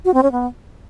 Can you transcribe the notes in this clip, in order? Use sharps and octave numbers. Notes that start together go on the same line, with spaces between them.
F#4
C4
C#4
B3